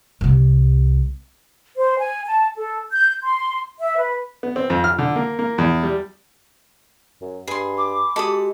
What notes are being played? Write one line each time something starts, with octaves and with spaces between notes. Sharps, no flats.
C2 C3
C5
G#5
A5
A4
G6
C6
E5
B4
B3
C4
F2
F6
D3
A#3
A#3
E2
G3
F#2
G2 G#4 B5 C6
D6
G#3 F#4 G4 A4 B5 D#6